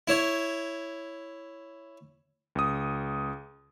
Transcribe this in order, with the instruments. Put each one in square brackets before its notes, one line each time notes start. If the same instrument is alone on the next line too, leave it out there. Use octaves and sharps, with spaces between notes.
[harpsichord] E4 C#5
[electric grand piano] C#2 D#6